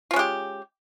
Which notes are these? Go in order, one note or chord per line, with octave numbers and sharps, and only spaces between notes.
G#3 C#4 F4 G4